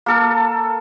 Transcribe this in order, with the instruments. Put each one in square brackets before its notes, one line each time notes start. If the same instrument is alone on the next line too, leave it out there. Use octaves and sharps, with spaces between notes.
[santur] A#3 A4 A#4